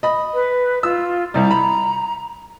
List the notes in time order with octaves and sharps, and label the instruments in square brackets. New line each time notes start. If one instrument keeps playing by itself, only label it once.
[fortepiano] D#5 B5
[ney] B4
[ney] F4 [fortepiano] E6
[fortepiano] C2 G3 [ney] A#5
[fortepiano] B5